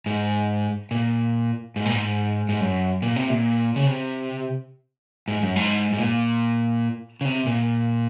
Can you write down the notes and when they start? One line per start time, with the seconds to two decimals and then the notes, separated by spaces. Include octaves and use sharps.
0.06 G#2
0.91 A#2
1.76 G#2
1.85 A#2
1.95 G#2
2.49 G#2
2.61 F#2
3.02 A#2
3.16 C3
3.29 A#2
3.76 C#3
3.87 C3
5.28 G#2
5.43 F#2
5.56 G#2
5.93 G#2
5.98 A#2
7.21 C#3
7.25 C3
7.46 A#2